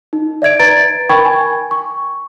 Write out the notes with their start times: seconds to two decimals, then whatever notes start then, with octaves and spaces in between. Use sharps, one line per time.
0.13 D#4
0.42 D5 E5 G#6 D7
0.59 B4 A#5 A6 D7
1.09 A#4 G5 B5 C#6 G#6
1.25 G#5
1.71 C#6